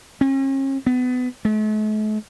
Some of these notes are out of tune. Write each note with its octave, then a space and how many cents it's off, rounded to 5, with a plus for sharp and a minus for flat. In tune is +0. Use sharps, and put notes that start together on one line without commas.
C#4 -40
B3 +25
A3 -45